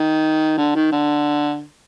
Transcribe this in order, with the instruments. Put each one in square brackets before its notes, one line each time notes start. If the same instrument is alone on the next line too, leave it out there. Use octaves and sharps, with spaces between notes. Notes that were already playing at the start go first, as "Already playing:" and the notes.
Already playing: [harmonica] D#3
D3
D#3
D3